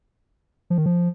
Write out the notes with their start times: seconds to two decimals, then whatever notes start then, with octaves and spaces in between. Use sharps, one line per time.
0.70 F3
0.78 D#3
0.86 F3